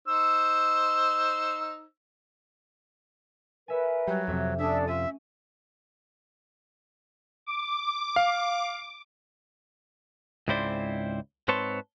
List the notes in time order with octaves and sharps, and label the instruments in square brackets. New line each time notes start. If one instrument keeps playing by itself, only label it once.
[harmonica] D#4 C5 E6
[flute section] A#4 B4 [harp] C#5 E5 G#5
[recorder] F#3 [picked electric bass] G3
[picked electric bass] F2 C3 [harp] E5
[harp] A3 C#4 [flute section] D4 A4 D#6 [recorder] E5
[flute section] F4 [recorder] E5 [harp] D#7
[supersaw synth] D6
[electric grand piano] F5
[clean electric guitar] C#2 G#2 C4 E4 C5 D5
G#2 C4 B4 C#5 A5 C6